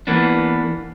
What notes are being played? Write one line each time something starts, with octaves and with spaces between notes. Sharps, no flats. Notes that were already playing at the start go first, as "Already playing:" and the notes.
E3 A#3 B3 D4